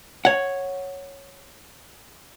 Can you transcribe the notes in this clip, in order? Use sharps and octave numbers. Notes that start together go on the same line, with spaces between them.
C#5 F#5